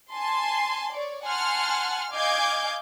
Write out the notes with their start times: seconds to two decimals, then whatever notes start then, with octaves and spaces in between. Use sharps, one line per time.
0.11 G#5 A5 C6
0.91 C#5 D5
1.25 F#5 G#5 A5 C6 F6
2.12 D#5 F5 G#5 D6 G6 G#6